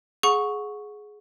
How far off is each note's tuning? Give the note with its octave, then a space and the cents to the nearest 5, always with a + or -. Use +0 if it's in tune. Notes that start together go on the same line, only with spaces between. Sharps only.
G#4 +10 F#5 -25 C#6 +0